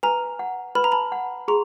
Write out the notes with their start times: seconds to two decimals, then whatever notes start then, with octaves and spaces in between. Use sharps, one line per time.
0.03 B4 G#5 A#5
0.39 F#5
0.75 B4 B5
0.84 A#5
0.92 A5 B5
1.12 F#5
1.48 G#4 A#5 C6